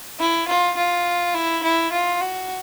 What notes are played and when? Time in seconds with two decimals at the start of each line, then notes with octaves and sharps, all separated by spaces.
0.20 E4
0.48 F4
0.77 F4
1.35 E4
1.63 E4
1.92 F4
2.21 F#4